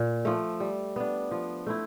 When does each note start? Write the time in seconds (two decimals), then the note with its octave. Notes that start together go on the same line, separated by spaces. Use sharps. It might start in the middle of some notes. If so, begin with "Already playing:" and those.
Already playing: A#2
0.25 F3 A3
0.60 G3
0.96 B3 D4
1.31 F3
1.66 A3 C4 E4